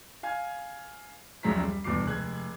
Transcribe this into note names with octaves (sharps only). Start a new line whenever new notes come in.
F5 G#5 G#6
D#1 A#1 F#2 G#3 A#5 B6
G3
G1 E2 B2 D6 C7
F1 G#3 F#6 G#6